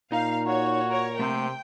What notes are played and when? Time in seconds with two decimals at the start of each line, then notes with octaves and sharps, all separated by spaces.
0.12 A#2 D#4 F5 A#5
0.47 F#4 C#5
0.89 A#4 C#5
1.19 C3 A3 A#3 C4 G5